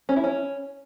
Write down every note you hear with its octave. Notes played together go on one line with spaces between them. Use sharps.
C#4
E4
C#4